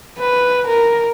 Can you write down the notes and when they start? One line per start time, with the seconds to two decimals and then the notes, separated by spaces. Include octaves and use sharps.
0.19 B4
0.67 A#4